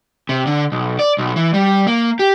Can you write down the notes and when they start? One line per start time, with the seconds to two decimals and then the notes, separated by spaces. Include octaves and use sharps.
0.29 C3
0.47 D3
0.72 B1
0.99 D5
1.18 B1
1.36 E3
1.54 G3
1.87 A#3
2.19 G4